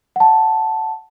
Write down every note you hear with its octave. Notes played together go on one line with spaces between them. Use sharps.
F#5 A5